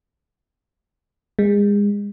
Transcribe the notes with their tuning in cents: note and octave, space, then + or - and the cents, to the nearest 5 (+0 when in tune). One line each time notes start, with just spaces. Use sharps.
G#3 -30